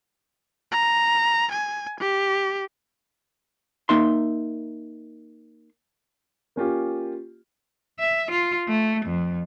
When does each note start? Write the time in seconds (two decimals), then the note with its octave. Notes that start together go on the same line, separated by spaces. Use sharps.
0.72 A#5
1.51 G#5
2.00 G4
3.89 A#3 D#4 E5 C6
6.56 A#3 C#4 F4 G4
7.99 E5
8.31 F4
8.68 A3
9.05 F2